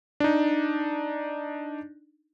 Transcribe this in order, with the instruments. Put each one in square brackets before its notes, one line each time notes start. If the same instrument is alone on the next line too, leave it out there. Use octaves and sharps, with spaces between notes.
[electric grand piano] D4 D#4